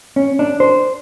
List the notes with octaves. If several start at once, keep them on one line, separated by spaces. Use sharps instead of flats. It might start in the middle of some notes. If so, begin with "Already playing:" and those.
C#4
D4
C5